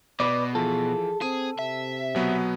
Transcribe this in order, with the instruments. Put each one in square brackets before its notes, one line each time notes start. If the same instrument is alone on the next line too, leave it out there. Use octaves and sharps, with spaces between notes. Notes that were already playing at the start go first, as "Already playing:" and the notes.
[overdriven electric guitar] B2 [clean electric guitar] B4 D5
[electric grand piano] E3 F3 [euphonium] G#4 [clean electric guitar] A4
[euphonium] C4 [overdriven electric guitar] G#4 [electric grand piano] D#7
[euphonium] C3 [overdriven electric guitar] E5
[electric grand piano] B2 F#3 B3